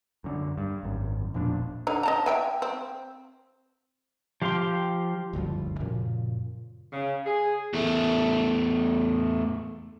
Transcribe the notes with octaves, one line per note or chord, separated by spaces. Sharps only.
F#2 D3
G2
G#1 F#2
E1 A#2 F3 D4
D3 D#4
D#5 A5 A#5
E5 G5 G#5
C4
F3 G4 F5 G5 C6
F#1 D2 G2 F3
F#2 A#2 C#3 F3
C#3
G#4
E2 A3